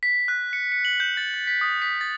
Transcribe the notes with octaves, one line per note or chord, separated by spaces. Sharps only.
B6
F#6
C#7
C#7
F#7
G6
A6
A6
B6
D#6
B6
A6